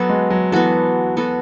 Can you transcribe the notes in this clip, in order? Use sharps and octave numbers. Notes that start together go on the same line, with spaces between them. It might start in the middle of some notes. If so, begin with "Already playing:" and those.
Already playing: F#3 B3 F#4 A4
G#3
F#3
E3 B3 F#4 A4
B3 F#4 A4